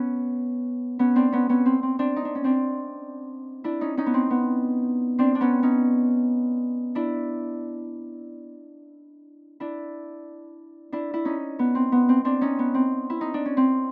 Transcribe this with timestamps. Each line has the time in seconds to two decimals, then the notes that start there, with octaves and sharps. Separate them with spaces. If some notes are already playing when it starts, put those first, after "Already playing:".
Already playing: B3 C#4
0.99 B3 C#4
1.16 C4 D4
1.32 B3 C#4
1.49 B3 C#4
1.66 C4
1.83 C4
1.99 C4 D4
2.16 D#4
2.25 D4
2.35 C#4
2.44 C4 D4
3.64 D4 E4
3.81 C#4 D#4
3.97 C#4 D#4
4.06 B3
4.14 C4
4.30 B3
5.19 C4 D4
5.35 D4
5.41 B3 C#4
5.63 C#4 D#4
6.95 D4 E4
9.60 D4 E4
10.92 D4 E4
11.14 E4
11.25 C#4 D#4
11.59 B3
11.75 C4
11.92 B3
12.09 C4
12.25 C4 D4
12.41 C#4 D#4
12.59 B3
12.75 C4
13.10 E4
13.21 D#4
13.34 D4
13.45 C#4
13.57 C4